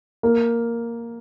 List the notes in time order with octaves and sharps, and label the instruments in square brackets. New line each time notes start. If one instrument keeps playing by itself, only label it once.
[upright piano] A#3